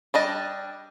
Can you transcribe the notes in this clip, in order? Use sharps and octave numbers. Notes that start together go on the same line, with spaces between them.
G3 D4 D#5